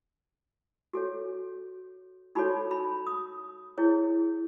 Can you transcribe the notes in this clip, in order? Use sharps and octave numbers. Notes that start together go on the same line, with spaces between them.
F#4 A4 C#5
D#4 F#4 A4 C#5 B5
B5
D#6
E4 G#4 C#5